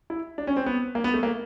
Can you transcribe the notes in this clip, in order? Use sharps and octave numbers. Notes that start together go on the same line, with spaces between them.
E4
D4
C#4
C4
B3
A#3
B3
A3
A#3